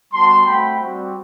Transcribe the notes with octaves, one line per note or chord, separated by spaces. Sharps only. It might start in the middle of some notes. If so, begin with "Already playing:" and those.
G3 B3 F#4 A5 C6
A3 C4 F#4 G5 B5
G3 C4 F#4